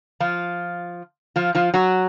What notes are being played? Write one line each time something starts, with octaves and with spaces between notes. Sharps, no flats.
F3 F4
F3 F4
F3 F4
F#3 F#4